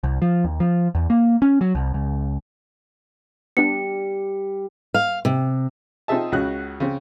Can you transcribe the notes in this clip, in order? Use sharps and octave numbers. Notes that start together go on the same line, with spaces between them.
C2
F3
D#2
F3
E2
A#3
C#4
F#3
C2
C#2
G3 B3 D4 C#7
F5
C3
C4 D#4 F4 G#4 E5 A5
C#2 C#3 F#4 F#6
C#3 C4